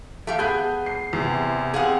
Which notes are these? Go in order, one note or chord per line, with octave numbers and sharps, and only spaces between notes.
A3 G4 F5
B3 G#4 G6
C7
E2 C3
C4 G#4 F5 F#5